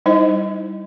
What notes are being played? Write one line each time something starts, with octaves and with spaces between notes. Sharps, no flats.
G3 D#4 E4 C5 D#5